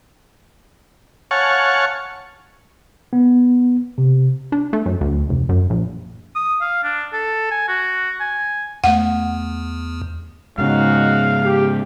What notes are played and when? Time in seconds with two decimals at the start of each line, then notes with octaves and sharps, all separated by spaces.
1.31 C#5 F5 F#5 G#5 A5 C#6
3.13 B3
3.98 C3
4.52 D4
4.73 A3
4.86 F#2
5.01 D2
5.29 F1
5.49 F#2
5.70 A#1
6.35 D#6
6.61 F5
6.84 D4
7.13 A4
7.51 G#5
7.68 F#4
8.20 G#5
8.84 E2 A3 F#5
10.58 G#2 C#3 G#3 D#4 F#4 F5
11.44 G4